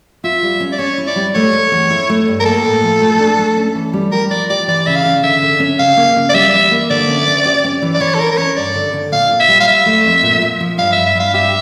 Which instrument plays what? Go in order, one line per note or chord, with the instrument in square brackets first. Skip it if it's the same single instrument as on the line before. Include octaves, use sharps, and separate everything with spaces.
[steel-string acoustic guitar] F4 [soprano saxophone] E5
[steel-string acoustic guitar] G3
C#4
[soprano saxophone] D5
[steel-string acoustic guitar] C#4 [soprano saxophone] C#5
[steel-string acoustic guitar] E4
[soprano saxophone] D5
[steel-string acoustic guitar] G3
[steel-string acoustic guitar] A3 [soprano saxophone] C#5
[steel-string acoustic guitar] A3
E2
E4
A3
G2
[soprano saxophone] A#4
[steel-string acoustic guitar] A#3 [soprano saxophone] A4
[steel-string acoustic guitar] A2
F3
A3
D4
A3
C#4
E3
G3
[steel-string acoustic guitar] G4 [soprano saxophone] A#4
[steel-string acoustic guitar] F3 [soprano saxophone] D5
[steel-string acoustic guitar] G4 [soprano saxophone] D5
[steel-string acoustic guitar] E3 [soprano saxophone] D5
[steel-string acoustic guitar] C#3 [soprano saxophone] E5
[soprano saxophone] F5
[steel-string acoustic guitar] C#3
[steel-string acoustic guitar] D3 [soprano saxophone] E5
[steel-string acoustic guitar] D3
C#4
[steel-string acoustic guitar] C#3 [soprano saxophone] F5
[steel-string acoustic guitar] A#3
C#3
[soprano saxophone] D5
[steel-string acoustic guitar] G3 [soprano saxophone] E5
[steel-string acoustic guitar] E3
A#3
[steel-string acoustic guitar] D3 [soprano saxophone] D5
[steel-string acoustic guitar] C#4
C#4
G4
C#4
E3
[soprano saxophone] D5
[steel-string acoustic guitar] E3 [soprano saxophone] C#5
[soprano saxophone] A4
[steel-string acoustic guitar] E3 [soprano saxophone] A#4
[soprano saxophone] A#4
[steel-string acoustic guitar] C#4 [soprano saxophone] C#5
[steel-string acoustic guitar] G2 [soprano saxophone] D5
[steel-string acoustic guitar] D3
D3
[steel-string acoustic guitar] A#2 [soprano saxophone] F5
[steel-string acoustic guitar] A#2
[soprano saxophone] E5
[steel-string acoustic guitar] G3
[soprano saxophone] F5
[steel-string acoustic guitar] E4 [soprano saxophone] E5
[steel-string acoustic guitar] A3
F2
A#2
A#2
F3
[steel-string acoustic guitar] G2 [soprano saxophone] F5
[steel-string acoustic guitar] G2 [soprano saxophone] E5
[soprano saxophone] E5
[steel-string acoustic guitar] G2 [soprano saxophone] F5
[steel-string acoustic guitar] G4 [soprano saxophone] E5